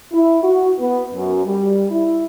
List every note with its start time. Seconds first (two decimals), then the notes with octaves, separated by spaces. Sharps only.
0.12 E4
0.43 F#4
0.78 B3
1.14 F#2
1.45 G3
1.90 E4